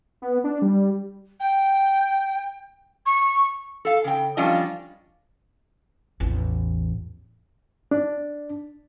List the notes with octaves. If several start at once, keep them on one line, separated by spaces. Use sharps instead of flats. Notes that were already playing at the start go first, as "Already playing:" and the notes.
B3
D4
G3
G5
C#6
A4 F5
C#3 G5
F3 G3 C#4 D4 F4 D#5
A1 E2
D4